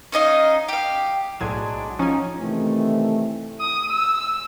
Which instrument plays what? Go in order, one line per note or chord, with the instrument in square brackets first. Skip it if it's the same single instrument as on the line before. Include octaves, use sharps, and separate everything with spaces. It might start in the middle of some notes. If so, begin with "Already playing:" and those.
[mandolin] C#4 D#4 D#5 F5
G4 F5
[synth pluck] B1 A2 G#6 [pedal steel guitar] F#3 G#3 D4
[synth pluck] F3 G#5 [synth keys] C#4 [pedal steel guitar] D#4
[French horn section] C3 D#3 E3 A3
[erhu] D#6
E6